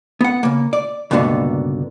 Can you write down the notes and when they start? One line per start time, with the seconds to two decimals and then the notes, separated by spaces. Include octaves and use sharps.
0.21 B3 F#5
0.43 C#3 A#3
0.73 D5
1.11 C#2 G2 B2 D3 A#3 B3